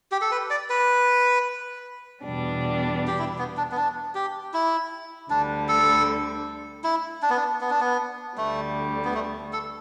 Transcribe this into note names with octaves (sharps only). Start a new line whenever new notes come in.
G4
A4
B4
D5
B4
E2 B2 G3 D4
G4
E4
B3
D4
B3
D4
G4
E4
D2 D3 G3 D4
A4
E4
D4
B3
D4
B3
D4
B3
D2 D3 G3 A3
B3
A3
A4